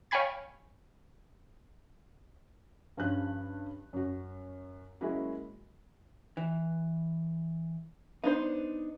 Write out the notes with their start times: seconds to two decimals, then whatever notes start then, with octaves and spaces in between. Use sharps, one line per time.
0.11 C#5 F5 G5 G#5 B5 G#6
2.97 G2 F3 C#4 F4 G4 F#6
3.93 F#2 F#4
5.01 F#3 G#3 A#3 C#4 E4 F#4
6.37 E3
8.24 B3 D4 D#4 C5